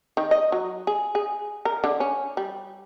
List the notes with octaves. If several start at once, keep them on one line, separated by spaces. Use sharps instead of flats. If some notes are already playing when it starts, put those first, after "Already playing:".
D#3
D#5
F#3
G#4
G#4
A#4
D3
C#4
G3